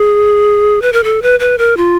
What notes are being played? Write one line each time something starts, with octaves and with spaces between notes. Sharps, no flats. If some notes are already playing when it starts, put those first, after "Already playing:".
Already playing: G#4
B4
A#4
A4
B4
B4
A#4
F4